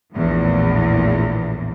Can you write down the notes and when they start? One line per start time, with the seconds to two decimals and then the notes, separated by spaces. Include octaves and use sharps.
0.13 A#1 E2 A2